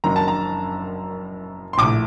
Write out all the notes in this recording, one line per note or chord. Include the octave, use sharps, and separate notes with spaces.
F#1 F#2 D#3 A#5
A5
A#5
C6
A#1 A2 D6